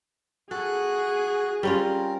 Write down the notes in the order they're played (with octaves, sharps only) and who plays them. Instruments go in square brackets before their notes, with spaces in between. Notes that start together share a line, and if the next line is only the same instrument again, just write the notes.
[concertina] F#4 F#6 [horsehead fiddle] G#4 [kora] A4
[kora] G3 C#4 F4 [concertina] C4 A#4